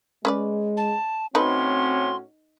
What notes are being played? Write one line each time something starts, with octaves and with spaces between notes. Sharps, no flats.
G#3 C#4 B4 D5
A5
A2 C4 C#4 D#4 F#4 A4 B4 C6